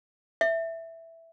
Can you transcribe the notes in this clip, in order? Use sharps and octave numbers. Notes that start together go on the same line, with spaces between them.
E5